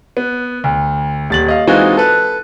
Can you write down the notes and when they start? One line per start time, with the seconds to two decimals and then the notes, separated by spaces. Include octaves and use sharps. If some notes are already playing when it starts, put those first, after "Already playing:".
0.17 B3
0.64 D2
1.30 D#1 A6 F#7
1.48 D#5 F5
1.67 E3 G#3 C4 D#4 F4 F#4
1.97 A4 B4